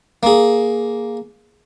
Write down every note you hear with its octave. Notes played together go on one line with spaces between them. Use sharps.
A#3 G#4